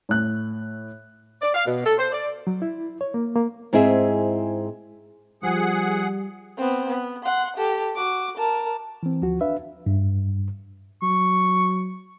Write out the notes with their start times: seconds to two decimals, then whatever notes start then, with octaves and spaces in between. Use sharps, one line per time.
0.09 A2 F#6
1.42 D5
1.53 F5
1.66 B2
1.85 A4
1.97 C5
2.12 D5
2.47 F#3
2.62 E4
3.01 C#5
3.14 A#3
3.36 A#3
3.73 G#2 C4 E4 G#4 E5
5.43 F3 G3 G#4 F#5
6.57 B3 C4
6.88 B3
7.24 F#5 C6
7.56 G4 A4
7.96 F#4 D6
8.37 A#4 A5
9.03 E3 C4
9.22 D2 F3 F#4
9.41 D4 B4 E5 F5
9.86 G2
11.03 F#3 C#6